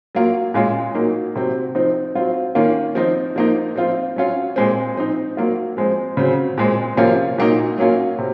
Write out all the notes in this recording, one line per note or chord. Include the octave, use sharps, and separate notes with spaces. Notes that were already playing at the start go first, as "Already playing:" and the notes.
F#3 A#3 F4
A#2 G#3 C#4 F4
F#3 A#3 D#4
C3 F#3 C4
F3 C4 D#4
F#3 C4 F4
D#3 A#3 C#4 F4
F3 C4 D#4
F3 A#3 D#4
F3 C4 F4
F#3 C#4 F4
A#2 G#3 C4
F3 C4 D#4
F#3 A#3 F4
F3 G#3 C4
C#3 F#3 C4
A#2 G#3 C4
C3 F3 A#3 C#4 F4
A#2 F#3 A#3 D#4
F#3 A#3 C#4 F4
C3